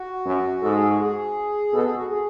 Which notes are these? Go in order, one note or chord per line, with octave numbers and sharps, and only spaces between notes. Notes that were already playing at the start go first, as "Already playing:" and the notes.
Already playing: F#4
F#2
G#2 A4
G#4
F#4
G#4
B2 A4
G#4
F#4
G#4